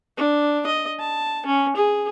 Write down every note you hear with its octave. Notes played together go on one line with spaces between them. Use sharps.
D4
D#5
A5
C#4
G#4